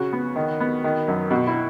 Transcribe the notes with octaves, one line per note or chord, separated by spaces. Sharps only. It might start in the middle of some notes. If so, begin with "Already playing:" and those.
Already playing: C#3 F#4
B3
D#3
B3
D#3
F#2
B2 F#4
E4